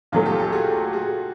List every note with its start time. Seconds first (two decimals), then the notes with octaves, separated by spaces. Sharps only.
0.12 A#2 F#3 A3 D#4 F4
0.25 G4 A4
0.39 G4 A4
0.52 F#4 G#4
0.93 F#4 G#4